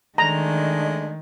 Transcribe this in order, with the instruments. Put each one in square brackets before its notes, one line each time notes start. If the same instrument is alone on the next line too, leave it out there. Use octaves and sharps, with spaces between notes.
[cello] D#3 [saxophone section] G#3 A3 D4 [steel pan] A#5